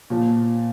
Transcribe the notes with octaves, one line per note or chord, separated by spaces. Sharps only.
A#2 F3